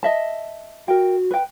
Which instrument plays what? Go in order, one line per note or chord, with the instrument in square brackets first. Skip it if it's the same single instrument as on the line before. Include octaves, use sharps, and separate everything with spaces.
[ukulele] D#5 E5 A5
[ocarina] F#4 [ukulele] A#4 G5
[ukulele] B4 G5